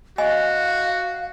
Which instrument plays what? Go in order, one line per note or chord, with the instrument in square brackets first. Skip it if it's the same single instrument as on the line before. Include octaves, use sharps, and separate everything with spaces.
[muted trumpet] F#4 [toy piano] D#5 G#5 [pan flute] F5